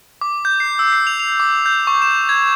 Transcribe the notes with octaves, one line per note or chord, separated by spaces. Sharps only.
D6
G6
C7
E6
C7
F7
F7
D6
G6
C#6
E7
G#6